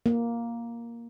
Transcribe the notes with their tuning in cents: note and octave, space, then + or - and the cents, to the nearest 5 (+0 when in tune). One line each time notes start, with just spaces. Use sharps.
A#3 +5